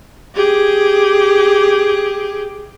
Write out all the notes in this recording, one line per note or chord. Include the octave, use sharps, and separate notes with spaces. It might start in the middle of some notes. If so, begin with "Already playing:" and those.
G4 G#4